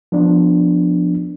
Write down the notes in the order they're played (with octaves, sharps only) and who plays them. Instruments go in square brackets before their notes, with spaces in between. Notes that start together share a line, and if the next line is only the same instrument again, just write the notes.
[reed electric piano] F3 B3 D4